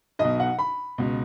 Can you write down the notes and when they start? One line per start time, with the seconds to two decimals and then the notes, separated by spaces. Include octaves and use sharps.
0.19 B1 D#5
0.24 B2
0.40 F#5
0.59 B5
0.98 C#2 B2